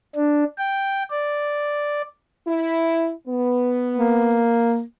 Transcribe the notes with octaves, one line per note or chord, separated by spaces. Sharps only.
D4
G5
D5
E4
B3
A#3